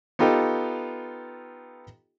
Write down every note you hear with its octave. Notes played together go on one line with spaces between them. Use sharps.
B3 D#4 F4 G4 A4